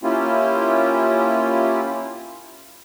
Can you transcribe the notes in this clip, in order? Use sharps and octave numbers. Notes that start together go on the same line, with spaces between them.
A#3 C#4 E4 F4 G4